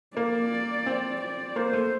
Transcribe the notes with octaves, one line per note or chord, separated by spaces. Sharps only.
A#3 D5
C4
D5
A#3 C5
A3